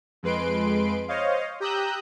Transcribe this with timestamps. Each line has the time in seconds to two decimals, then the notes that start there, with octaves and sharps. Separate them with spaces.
0.23 F2 G#3 B4 C6 D7
1.08 C5 C#5 D#5 F5
1.60 G4 A#5 D#6 E6 F#6 G6